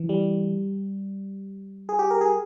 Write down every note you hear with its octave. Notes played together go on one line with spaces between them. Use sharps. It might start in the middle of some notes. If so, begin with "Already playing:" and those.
Already playing: E3
G3
G#4
G4
A#4
G#4